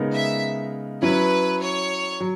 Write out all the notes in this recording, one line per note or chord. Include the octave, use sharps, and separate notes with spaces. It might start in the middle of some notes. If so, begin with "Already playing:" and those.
Already playing: C#3 G#3 B3 D#4 A#4
E5
F#3 C#4 E4 B4
C#5
F#3